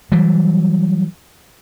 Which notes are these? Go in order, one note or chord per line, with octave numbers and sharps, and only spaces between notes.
E3 F#3 G3